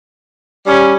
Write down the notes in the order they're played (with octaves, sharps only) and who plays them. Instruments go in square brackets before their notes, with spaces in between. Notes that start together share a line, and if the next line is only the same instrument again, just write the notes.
[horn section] G3 C#4